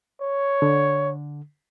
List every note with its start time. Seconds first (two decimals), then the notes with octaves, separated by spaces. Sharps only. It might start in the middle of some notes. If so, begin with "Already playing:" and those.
0.21 C#5
0.62 D3